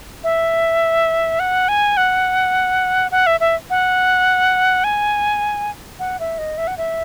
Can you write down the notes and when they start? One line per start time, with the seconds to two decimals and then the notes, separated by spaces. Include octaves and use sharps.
0.24 E5
1.40 F#5
1.68 G#5
1.97 F#5
3.11 F#5
3.27 E5
3.40 E5
3.70 F#5
4.84 G#5
5.99 F#5
6.20 E5
6.38 D#5
6.58 E5
6.67 F#5
6.78 E5